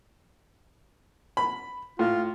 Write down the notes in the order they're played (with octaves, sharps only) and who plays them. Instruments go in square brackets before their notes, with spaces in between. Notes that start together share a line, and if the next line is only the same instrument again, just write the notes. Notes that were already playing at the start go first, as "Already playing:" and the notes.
[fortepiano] B5
[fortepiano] A2 [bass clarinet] F4